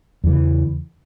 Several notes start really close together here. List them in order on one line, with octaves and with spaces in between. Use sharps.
E2 E3 C#3